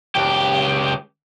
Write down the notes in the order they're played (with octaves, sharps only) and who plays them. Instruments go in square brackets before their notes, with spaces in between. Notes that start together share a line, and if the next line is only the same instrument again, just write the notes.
[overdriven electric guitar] C#2 G4